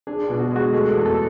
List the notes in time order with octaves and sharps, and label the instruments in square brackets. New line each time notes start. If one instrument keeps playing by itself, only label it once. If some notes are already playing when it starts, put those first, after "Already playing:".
[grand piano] D4 [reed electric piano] G#4
[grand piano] B2
[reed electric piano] F#4
[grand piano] G#3
[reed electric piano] F#4
[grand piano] A3 [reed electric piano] G#4
[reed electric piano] A4
[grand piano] E2
[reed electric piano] A4